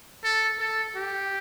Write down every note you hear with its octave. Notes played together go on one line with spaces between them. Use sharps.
A4
A4
G4